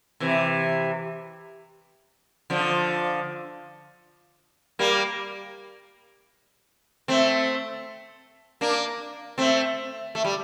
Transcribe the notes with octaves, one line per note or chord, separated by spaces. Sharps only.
C3 E3
D3 F3
G3 A#3
A3 C4
A#3 D4
A3 C4
A3
G3